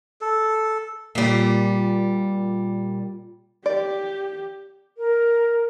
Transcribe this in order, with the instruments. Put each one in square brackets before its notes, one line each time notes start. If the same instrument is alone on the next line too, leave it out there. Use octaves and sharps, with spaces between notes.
[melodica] A4
[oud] A#2 G3
[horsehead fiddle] G4 [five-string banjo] D5
[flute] A#4